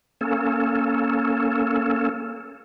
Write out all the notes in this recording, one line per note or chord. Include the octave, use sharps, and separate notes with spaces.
A#3 C#4 A4